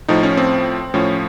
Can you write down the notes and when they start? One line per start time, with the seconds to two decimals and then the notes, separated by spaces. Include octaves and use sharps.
0.08 A2 F3 D#4
0.23 C#4
0.37 C4
0.94 A2 F3 C#4